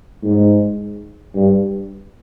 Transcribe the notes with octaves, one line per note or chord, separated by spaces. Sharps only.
G#2
G2